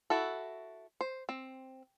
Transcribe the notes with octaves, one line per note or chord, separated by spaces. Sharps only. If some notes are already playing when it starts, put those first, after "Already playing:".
E4 F#4 A4
C5
C4